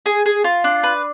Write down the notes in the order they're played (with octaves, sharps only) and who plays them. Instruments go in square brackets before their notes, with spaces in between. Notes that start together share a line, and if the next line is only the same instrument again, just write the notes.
[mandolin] G#4
G#4
F4
D4
B4